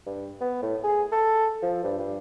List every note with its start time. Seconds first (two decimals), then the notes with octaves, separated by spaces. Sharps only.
0.06 G2
0.41 B3
0.62 A2
0.84 G#4
1.12 A4
1.62 F3
1.84 G2
1.99 G2